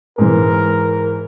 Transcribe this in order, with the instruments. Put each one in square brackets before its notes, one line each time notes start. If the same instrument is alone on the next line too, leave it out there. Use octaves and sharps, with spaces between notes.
[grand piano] G#2 E3 [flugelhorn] A#4